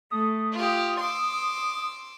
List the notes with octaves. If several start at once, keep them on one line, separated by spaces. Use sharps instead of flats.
A3 D#6
F4 G4
C6 D6 E6